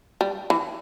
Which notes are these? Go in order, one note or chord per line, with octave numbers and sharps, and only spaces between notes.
G3
E3